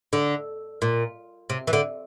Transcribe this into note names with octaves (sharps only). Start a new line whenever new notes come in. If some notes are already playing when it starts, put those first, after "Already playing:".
D3
A#2
C3
E3
D3